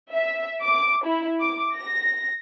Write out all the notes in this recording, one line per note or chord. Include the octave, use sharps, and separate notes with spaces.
E5
D6
E4
D6
A#6